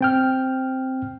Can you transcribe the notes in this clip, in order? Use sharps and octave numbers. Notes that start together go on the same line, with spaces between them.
C4 G5 F6